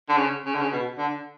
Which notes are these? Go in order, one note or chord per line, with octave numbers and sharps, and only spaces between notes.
D3
C#3
C#3
D3
C#3
B2
D3